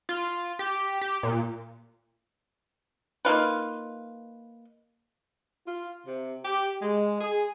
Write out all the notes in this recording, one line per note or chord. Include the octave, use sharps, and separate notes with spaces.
F4
G4
G4
A#2
A#3 D#4 F4 B4
F4
C3
G4
G#3
G#4